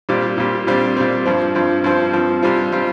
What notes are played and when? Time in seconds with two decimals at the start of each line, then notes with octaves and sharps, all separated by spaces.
0.09 A#2 G3 C4
0.38 A#2 G3 C4
0.67 A#2 G3 C4
0.97 A#2 G3 C4
1.25 G2 F3 C4
1.55 G2 F3 C4
1.84 G2 F3 C4
2.13 G2 F3 C4
2.42 C3 G3 C4 F4
2.72 C3 G3 C4 F4